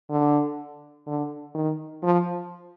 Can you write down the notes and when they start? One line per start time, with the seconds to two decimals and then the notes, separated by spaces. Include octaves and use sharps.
0.10 D3
1.07 D3
1.55 D#3
2.03 F3